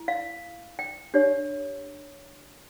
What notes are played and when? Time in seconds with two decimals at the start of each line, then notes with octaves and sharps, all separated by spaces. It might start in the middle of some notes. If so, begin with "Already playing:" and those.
Already playing: E4
0.08 F5
0.79 G5
1.14 D4 G4 C#5